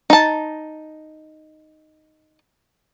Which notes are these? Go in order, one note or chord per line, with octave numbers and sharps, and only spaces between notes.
D#4 A5